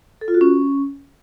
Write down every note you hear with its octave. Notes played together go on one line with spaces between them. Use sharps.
A4
F4
F#4
C#4